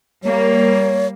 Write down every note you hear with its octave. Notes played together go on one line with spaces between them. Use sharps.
G3 A#3 C#5